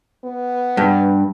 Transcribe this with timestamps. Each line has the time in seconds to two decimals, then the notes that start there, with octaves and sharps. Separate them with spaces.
0.24 B3
0.77 G2